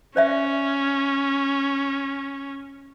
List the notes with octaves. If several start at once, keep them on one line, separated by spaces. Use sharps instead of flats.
C#4 C5 D5 E5